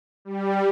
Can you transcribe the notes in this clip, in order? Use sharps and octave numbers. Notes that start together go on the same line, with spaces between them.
G3